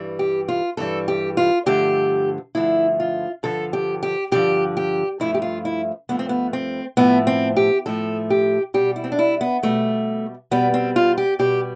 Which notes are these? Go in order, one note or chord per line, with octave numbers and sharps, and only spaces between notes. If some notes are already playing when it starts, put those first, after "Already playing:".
Already playing: G2 E3 G3
G4
F4
G2 E3 G3 A4
G4
F4
G2 D3 F3 A3 G4
G2 D3 F3 A3 E4
F4
G2 D3 F3 A4
G4
G4
G2 D3 F3 G4
G4
G2 F3 A3 E4
G4
F4
E4
G2 F3 A3 B3
C4
B3
C4
A2 F3 A3 B3
C4
G4
A2 F3 A3 A4
G4
B2 G3 G4
E4
C4
D4
E4
B3
B2 G3 A3
B2 G3 B3
C4
F4
G4
B2 G3 G4